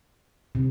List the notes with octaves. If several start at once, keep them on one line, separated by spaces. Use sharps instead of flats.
C3